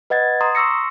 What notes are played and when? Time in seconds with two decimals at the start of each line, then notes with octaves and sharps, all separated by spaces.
0.10 B4 D#5 F#5 G#6 A6
0.41 A#5 C6 D#6
0.55 C6 C#6 E6 A#6 C#7